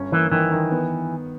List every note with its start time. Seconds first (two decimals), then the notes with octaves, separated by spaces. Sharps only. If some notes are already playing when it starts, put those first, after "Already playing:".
Already playing: G1 C#4
0.12 E3 A#3
0.31 D#3 E3
0.52 D#3
0.72 B3